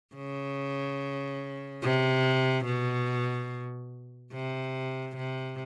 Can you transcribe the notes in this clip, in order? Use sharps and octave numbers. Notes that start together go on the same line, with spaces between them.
C#3
C3
B2
C3
C3